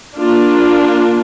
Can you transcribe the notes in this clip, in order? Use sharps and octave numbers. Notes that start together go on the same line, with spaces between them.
A#3 D4 F4